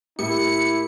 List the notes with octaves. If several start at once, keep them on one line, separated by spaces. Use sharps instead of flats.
A2 A#3 E4 G4 C#7